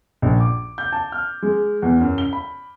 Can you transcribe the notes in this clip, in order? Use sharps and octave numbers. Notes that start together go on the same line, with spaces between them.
A#1
D6
G6
A5
F6
G#3
E2
F#2
G7
B5